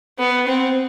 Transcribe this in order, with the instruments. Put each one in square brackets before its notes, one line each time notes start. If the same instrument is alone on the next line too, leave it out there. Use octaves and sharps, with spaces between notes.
[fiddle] B3
C4